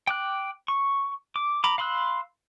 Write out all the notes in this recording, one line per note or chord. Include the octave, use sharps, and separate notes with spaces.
G5 D6 F#6
C#6
D6
A#5 B5 D6
F5 B5 C6 E6 F#6